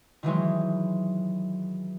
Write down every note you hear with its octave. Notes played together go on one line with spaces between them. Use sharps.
D#3 E3 F#3 G#3